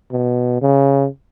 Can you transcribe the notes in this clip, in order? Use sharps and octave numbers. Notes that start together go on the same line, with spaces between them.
B2
C#3